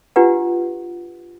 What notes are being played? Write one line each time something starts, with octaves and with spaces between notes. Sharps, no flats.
D4 F4 G4 B4 F#5